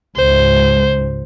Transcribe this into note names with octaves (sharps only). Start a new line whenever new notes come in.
C#2 G#2 C5